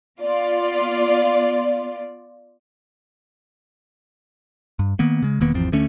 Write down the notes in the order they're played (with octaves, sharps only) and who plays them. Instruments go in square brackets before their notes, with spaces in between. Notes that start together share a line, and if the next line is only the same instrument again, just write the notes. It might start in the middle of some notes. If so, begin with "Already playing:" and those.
[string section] B3 F4 D5
[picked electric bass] G2
D#3 A#3 B3
C#3 G#3
E1 D#3 A#3 B3
G#1 E2 F3 C4
D2 D3 A3 C#4